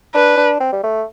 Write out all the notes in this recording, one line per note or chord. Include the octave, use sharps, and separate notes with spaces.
D4 B4
D4
C4
G3
A3